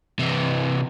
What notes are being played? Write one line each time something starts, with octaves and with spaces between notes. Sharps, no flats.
C3 E3